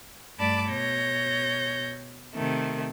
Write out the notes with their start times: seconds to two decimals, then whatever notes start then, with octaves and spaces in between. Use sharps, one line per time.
0.38 G2 A3 D5 A5 B5 D6
0.70 B2 C#5 G6 A#6
2.34 C3 D#3 A3